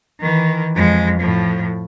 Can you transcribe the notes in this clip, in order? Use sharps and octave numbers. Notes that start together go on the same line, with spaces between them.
D#3 E3
F2 G#3
A2 F3